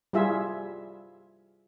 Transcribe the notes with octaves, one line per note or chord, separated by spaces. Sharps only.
G3 E4 F4 G#4 E5